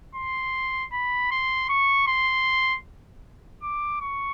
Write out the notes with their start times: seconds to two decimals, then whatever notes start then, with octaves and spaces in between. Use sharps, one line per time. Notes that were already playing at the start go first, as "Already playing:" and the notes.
0.15 C6
0.92 B5
1.31 C6
1.69 C#6
2.08 C6
3.63 D6
4.01 C#6